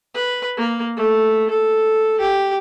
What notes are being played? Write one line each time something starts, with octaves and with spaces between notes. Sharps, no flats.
B4
A#3
A3
A4
G4